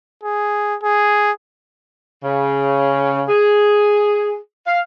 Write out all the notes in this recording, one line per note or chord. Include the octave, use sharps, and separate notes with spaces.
G#4
G#4
C#3
G#4
F5